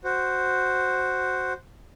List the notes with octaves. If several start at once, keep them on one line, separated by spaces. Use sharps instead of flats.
F#4 C5